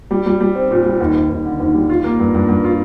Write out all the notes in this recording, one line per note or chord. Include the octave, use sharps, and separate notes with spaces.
G3
G3
G3
C4
A#2
G3
D#2
D#2
D#2
D3
D#2
G3
F4
A#3
G2
G2
G2
F4